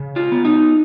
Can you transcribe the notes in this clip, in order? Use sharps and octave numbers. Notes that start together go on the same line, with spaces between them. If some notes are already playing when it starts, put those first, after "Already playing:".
Already playing: C#3
F4
B3
D#4